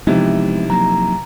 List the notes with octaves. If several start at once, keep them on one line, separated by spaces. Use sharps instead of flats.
C3 E3 F3 G#3 B3 C4 D#4
F#3 A#3 A#5